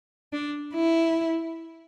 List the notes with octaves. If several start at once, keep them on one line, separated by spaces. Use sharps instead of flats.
D4
E4